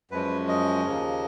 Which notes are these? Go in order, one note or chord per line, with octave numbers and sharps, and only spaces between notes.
F#2 F3 G#3 C#4 B4
D#5
D#2 C#3 F3 A#3